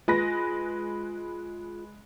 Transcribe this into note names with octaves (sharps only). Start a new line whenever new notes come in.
G#3 F4 B4 A#6